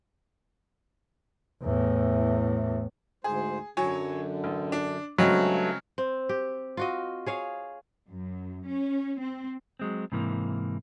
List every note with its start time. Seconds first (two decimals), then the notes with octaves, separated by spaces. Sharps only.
1.63 E2 A2
3.24 D2 G#2 G#4 C5
3.77 F#2 D3 F#3 C#5 G#5
4.44 A1
4.72 D4
5.18 G2 C#3 F#3 G#3 A3 C4
5.98 C4
6.29 G4
6.77 F4 F#4 D#5
7.26 G#4 C#5 F5
8.08 F#2
8.68 C#4
9.20 C4
9.80 F#3 G#3 C4
10.12 G#2 C3 E3 A#3